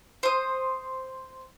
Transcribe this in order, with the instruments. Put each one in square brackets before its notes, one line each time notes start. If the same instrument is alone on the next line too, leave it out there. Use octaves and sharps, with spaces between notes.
[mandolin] C5 D#6